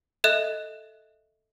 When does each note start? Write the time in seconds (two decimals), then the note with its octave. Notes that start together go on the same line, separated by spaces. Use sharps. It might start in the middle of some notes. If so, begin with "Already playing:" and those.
0.24 A4 D#5 E5 F#6 E7